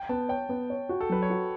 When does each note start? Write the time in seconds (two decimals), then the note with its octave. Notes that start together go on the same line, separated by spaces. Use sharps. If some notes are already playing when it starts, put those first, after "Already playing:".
Already playing: G5
0.09 B3 A5
0.29 C#5 G5
0.49 B3
0.70 C#5
0.89 F#4
1.01 A4
1.09 F#3 B4
1.22 C#5
1.30 F#4